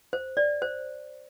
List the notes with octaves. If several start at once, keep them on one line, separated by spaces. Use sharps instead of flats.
C5
D5
C5